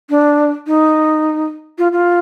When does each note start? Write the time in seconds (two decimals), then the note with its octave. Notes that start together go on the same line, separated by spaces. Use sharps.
0.10 D4
0.67 D#4
1.78 F4
1.92 F4